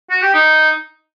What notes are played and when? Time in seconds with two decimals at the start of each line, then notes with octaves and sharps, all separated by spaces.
0.10 F#4
0.22 G4
0.34 D#4